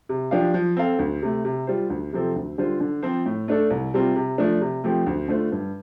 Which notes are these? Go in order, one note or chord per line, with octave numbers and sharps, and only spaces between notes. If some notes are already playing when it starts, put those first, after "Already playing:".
C3
F3 D4 G4 F5
F3
C4 A4 F5
D2
C3 A3
C3
G3 F4 C5
D2
C3 F3 C4 A4
D2
D3 G3 F4 C5
D3
F3 C4 F4 C5
A2
A3 D4 A4
C2
C3 G3 C4 F4
C3
F3 A3 D4
C3
F3 A3 C4 G4
D2
D3 A3 F4 C5
G2